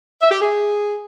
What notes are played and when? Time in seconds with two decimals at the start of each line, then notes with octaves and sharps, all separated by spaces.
0.21 E5
0.31 G4
0.41 G#4